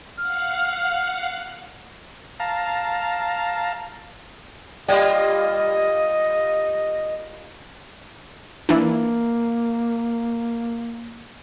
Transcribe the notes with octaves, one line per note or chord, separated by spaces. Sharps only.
F5 F#5 F6
F5 A5 A#5
G3 A#3 F4 D5 D#5 G5
E3 A#3 D4